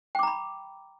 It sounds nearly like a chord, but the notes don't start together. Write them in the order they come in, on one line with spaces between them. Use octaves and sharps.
G5 D6 A#5 B5